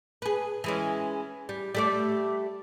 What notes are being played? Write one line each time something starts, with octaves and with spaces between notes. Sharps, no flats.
G#4 B4
E3 G#3 C#4
G3
G3 A3 D5